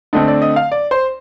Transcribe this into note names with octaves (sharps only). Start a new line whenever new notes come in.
D3 A3 C4 D#5
D5
D#5
F5
D5
C5